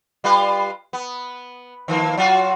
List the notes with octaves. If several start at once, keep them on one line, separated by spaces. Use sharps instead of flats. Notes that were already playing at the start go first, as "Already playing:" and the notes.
G3 F4 B4
B3
D#3 F3 A#3
F#3 F4 F#4